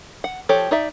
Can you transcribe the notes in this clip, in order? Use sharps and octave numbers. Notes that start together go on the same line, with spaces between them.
F#5
F3 G4 A4 C#5
D#4 D5 E5